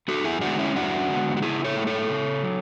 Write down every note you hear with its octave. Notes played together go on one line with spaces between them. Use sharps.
F#2 F#4 A4
E4 G#4
D3 G#3 B3 D4 F#4
C#4 E4
F#2 D4 F#4
D3 G#3 B3
F#4
C#3 E4 G#4
A4 C#5
F#3 A3
A4 C#5
C#3
F#3